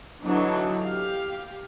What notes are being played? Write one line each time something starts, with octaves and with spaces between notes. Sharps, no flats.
D3 E3 F#3 D4 D#4
G4 F5